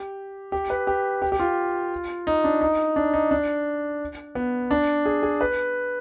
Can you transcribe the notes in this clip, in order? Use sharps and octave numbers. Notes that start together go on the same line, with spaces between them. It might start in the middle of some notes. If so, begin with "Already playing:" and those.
Already playing: G4
G4
B4
G4
G4
G4
F4
D#4
D4
D#4
D4
D#4
D4
B3
D4
G#4
G#4
B4